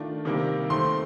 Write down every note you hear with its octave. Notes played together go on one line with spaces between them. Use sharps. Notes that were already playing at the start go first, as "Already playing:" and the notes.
Already playing: D#3 A3 D4 F4
C3 D#3 G3 A#3
D#3 A3 C4 C6